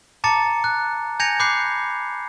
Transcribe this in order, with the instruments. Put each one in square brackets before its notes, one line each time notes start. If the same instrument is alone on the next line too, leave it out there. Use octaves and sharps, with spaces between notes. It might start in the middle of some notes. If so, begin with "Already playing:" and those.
[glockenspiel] A5 A#5 D6 A6 C#7
F#6
G#5 G6 G#6 A#6 C#7 F7
B5 D6 F#6 G6 C7 C#7